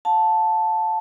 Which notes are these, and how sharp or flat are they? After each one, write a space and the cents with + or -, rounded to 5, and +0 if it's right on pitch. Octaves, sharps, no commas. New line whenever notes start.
F5 +40 A5 +0